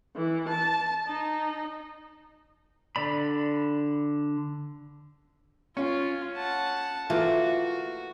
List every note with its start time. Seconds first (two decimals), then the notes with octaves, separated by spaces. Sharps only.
0.16 E3
0.48 A5
1.07 D#4
2.96 D3 D5 B5
5.77 C#4 F4
6.36 F#5 A5
7.10 E3 A3 A#3 F4 F#4